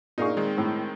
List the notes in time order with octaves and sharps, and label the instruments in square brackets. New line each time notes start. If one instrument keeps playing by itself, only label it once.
[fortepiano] A#2 G#4 C#6 [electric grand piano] D#4 A#4 F5
[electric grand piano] D#3 G#3 C4
[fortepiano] A2